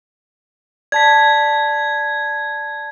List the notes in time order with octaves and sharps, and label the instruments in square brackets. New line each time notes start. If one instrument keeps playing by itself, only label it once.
[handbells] D5 A5 B6 [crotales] G#6